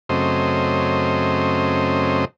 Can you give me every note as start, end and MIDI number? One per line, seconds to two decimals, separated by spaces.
0.09 2.25 42
0.09 2.25 49
0.09 2.25 57
0.09 2.25 60
0.09 2.25 72
0.09 2.25 75